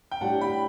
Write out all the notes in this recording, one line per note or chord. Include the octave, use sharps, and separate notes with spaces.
G5
A2 G3 D4 F#5 A5
G5 B5